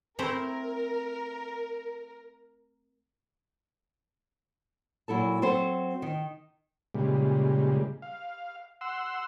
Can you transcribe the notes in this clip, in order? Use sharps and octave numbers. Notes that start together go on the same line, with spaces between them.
A3 C4 E4 A#4
A#2 F#3 E4 A4 A5
F#3 C4 A4 C5
D#3
A#2 C#3 G3 G#3
F5
F#5 C6 E6